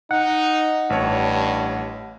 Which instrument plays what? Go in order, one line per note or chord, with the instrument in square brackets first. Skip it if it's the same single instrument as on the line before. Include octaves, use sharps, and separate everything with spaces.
[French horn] D#4 [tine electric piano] F#5
[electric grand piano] A1 C#5 [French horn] G2